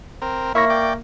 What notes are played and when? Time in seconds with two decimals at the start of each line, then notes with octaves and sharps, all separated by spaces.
0.22 C4 A#4
0.55 A#3 E4 C#5 E5 C#6 A#6
0.70 D5 G5